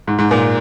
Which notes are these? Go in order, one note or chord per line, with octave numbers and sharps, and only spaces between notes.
G#2
G#2
A#2